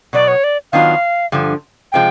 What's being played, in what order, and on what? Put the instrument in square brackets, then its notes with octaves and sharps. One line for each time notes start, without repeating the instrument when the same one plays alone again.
[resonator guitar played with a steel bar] B2 F#3 B3 [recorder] D5
[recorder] C#5
D5
[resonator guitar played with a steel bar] D#3 F#3 B3 D4 F4 [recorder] F5
[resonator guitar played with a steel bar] G2 D3 F3
[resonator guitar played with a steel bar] C3 F3 G#3 [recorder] G5